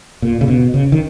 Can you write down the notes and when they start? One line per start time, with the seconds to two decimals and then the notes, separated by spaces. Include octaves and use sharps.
0.22 A#2
0.41 C#3
0.48 B2
0.74 C#3
0.92 D#3